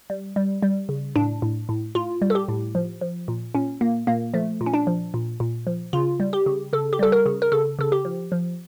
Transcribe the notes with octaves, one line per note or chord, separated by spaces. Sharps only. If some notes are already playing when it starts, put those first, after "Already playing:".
G3
G3
G3
C#3
A2 D4
A2
A2
A2 F4
G3
A4
G4
A2
F3
F3
A#2
A#2 C#4
A#2 A#3
A#2 A#3
F3 A3
A#2
C#4
D4
F3
A#2
A#2
F3
C#3 F4
G3
G4
C#3
C#3 A4
G4
G3 A4
A#4
C#3
A#4
C#3 A4
C#3 A4
G4
F3
F3